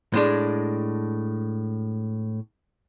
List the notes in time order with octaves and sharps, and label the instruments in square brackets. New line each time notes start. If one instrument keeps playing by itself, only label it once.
[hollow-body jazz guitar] A2 G#3 D4